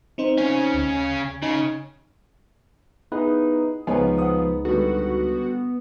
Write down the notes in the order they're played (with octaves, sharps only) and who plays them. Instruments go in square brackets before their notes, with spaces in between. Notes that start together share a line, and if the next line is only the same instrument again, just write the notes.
[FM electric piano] C4 D#4 C5
[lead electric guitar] C#3 C#4
[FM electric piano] D2
[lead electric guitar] C#3 [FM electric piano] D#4
[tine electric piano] B3 E4 B4 [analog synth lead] D#4 [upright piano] G#4
[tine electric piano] C#2 G#3 D#4 [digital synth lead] F3 [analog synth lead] B3 [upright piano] B4 C#5 G#5
[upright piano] F#5 D#6
[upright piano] D3 G3 [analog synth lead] B3 [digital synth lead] F#4